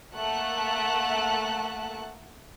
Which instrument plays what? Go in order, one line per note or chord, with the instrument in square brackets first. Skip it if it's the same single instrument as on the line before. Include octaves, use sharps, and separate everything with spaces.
[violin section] A3 A#3 E5 F#5 A5 F#6